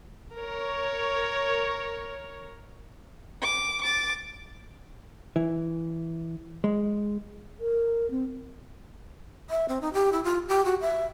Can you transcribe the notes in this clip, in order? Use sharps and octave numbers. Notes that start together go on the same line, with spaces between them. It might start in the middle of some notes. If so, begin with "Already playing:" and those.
A#4 C#5
D6
D6 A6
E3
G#3
A#4
C4
E5
C4
D#4
G4
E4
F4
G4
F#4
E5